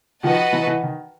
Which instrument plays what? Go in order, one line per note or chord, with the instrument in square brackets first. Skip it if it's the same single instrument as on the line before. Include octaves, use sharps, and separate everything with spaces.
[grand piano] D#3 F3 [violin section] F#4 B4 D#5 F#5 A5
[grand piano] E3 F#3
E3
D#3